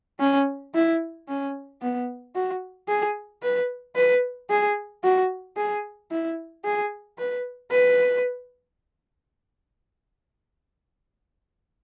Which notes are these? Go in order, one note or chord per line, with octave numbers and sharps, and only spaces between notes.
C#4
E4
C#4
B3
F#4
G#4
B4
B4
G#4
F#4
G#4
E4
G#4
B4
B4